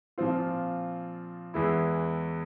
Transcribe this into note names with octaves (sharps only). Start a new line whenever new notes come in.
A#2 F3 C4 F4
E2 E3 G#3 E4